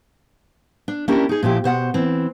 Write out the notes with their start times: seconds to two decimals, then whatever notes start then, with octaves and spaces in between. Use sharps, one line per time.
0.88 D4
1.08 A#3 C#4 D4 E4 G4 A#4
1.29 D#4 G#4
1.43 A#2 F3 E4 G4
1.64 B2 C5 F#5
1.94 E3 C4